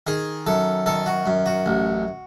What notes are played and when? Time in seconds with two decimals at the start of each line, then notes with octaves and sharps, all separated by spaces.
0.07 D#3 G#4
0.46 F#2 A4
0.86 D#3 A4
1.06 F#4
1.26 F#2
1.46 F#4
1.66 A1